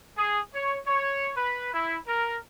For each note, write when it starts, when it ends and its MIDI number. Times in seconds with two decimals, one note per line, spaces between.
0.17 0.40 68
0.55 0.79 73
0.86 1.31 73
1.37 1.73 71
1.74 1.98 64
2.07 2.37 70